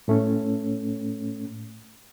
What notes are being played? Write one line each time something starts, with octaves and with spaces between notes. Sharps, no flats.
A2 A3 C#4